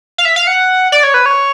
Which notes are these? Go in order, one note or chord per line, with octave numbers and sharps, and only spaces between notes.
F5
E5
F5
F#5
D5
C#5
B4
C#5